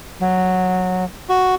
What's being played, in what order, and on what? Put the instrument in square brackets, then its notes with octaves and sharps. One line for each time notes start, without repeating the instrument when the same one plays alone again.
[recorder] F#3
[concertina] F#4